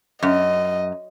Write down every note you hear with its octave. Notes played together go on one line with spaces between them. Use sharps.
F#2 D#5